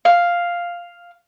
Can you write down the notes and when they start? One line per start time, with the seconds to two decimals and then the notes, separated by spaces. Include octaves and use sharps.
0.05 F5